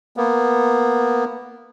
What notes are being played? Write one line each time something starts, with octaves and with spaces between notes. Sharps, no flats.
A#3 B3